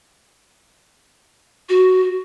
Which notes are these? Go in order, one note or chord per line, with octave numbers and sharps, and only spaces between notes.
F#4